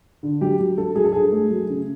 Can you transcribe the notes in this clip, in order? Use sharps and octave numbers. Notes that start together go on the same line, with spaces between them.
D3
F#3 G4
F#3
F#3 A4
F#3 G#4
A4
G2 G#4
A3
F#3
C#3